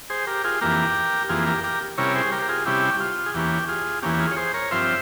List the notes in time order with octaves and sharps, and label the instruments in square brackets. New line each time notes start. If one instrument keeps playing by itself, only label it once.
[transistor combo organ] G#4 C5
G4 A#4
F4 G#4
F2 E3 A#3 G4 A#4
F2 E3 A#3 F4 G#4
G4 A#4
G4 A#4
C3 G3 C#4 E4 A#4 C#5
G#4 C5
G4 A#4
A#4
F4 G#4
C3 G3 C#4 E4 G4
F4
G#4
E2 E3 A#3 C#4 G4
F4 G#4
E2 E3 A#3 C#4 G4
G4
F4 G#4
C#5
G#4 C5
A#4 C#5
G2 F3 C4 F4 C5 E5